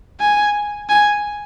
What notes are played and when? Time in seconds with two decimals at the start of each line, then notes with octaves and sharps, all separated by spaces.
0.20 G#5
0.89 G#5